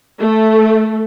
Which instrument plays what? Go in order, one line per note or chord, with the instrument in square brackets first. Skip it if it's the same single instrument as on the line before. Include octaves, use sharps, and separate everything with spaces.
[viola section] A3